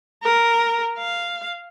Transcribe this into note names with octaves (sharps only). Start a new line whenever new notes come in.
A#4
F5